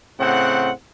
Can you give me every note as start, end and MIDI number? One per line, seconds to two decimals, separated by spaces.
0.20 0.71 45
0.20 0.71 49
0.20 0.71 60
0.20 0.71 78